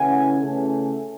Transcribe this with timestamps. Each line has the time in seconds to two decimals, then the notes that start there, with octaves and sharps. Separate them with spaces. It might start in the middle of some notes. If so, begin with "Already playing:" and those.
Already playing: C#3 E3 A3 C#4 E4 F#5 G#5
0.41 C#3 E3 A3